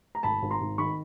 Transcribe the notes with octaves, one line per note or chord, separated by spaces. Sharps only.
A#5
G#1 A5 B5
G#1
A#5 C6
G#1
D#3 B5 C#6